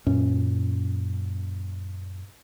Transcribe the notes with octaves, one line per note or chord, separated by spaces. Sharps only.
F#2 A#2 C#4